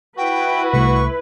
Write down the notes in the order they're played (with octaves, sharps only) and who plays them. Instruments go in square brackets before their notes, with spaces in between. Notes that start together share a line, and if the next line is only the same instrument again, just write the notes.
[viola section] E4 B4 [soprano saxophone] F#4 [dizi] G5
[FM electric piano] C2 A3 B6 [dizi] C#6